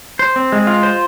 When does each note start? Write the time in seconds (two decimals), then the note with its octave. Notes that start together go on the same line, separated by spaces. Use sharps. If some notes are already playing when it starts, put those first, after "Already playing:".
0.19 C5
0.36 C4
0.52 G#3
0.67 F4
0.83 C5